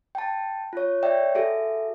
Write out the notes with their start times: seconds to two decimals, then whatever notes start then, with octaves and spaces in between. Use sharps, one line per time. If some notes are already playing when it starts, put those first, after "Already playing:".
0.15 G5 A5
0.73 F4 C#5
1.03 C#5 D5 E5 G5
1.35 F#4 G#4 A4 E5